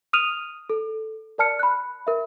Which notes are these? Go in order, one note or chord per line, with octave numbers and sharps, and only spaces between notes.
D#6 F6 D#7 F7
A4
A#4 D5 A5 F6 C#7
B5 F#6
A#4 E5